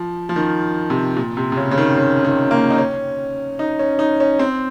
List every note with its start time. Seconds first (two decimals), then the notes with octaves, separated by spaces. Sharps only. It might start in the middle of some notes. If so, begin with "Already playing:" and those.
Already playing: F3
0.29 F3
0.36 D#3
0.90 C3
1.17 A#2
1.37 C3
1.52 C3
1.57 C#3
1.71 C#3
1.78 D#3
1.97 C#3
2.25 D#3
2.51 A#3
2.70 D#4
2.78 C#4
3.59 D#4
3.79 C#4
3.99 D#4
4.20 C#4
4.39 C4